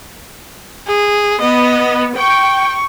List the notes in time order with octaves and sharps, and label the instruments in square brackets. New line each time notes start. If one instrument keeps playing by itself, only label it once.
[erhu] G#4
[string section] B3 [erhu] D#5
[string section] G5 [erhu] C#6